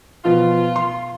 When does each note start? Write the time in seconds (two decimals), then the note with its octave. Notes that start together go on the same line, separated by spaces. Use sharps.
0.25 B2 F3 F4
0.76 C6